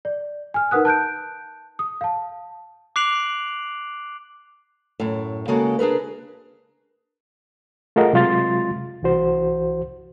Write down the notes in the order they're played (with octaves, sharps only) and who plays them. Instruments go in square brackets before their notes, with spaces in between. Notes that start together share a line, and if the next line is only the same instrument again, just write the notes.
[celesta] D5
G#5 F6
D#4 A#4 B4 F#5 D#6 F#6
A5 F#6 G6 D7
D#6
F5 A5
[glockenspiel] D6 F#6 C7 D7 F7 F#7
[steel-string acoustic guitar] F#2 A2
C#3 G#3 A#3 F#4 A4
D4 G#4 A#4 B4
[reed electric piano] A3 F4 G#4 A#4 D#5 F#5
C3 F#3 G#3 F4 C6 A6
C2 E3 F#4 C5